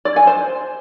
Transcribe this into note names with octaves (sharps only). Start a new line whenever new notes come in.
D5
G#5
C5